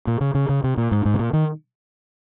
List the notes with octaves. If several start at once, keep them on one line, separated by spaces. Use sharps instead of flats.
A#2
C#3
C#3
C#3
C3
A#2
G#2
G#2
C3
A#2
D#3